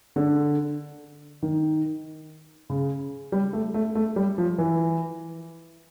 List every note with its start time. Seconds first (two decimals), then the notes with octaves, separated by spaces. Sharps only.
0.16 D3
1.43 D#3
2.70 C#3
3.32 G3
3.53 A3
3.74 A3
3.95 A3
4.16 G3
4.38 F3
4.58 E3